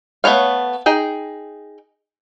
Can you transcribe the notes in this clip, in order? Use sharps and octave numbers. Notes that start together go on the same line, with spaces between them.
A3 B3 B4 C#5 F5
D#4 G#4 G5